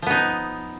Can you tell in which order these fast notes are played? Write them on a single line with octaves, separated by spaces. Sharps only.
F3 B3 D#4